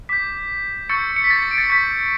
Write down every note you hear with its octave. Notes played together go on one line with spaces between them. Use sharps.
D6 G6 B6
C#6 E6 G6 A6 C#7
C#7
B6
A6 C#7
C#7
D7
A6 C#7
C#6 G6 B6